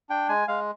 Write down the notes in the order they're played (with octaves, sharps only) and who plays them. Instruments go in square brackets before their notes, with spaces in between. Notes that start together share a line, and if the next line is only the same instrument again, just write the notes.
[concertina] D4 G5
G#3 G#5
G#3 F5